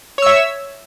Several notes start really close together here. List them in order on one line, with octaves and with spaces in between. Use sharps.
C#5 E6 E5